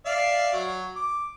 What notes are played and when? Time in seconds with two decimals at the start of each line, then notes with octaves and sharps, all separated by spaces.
0.06 D5 E5 F5
0.53 F#3
0.96 D6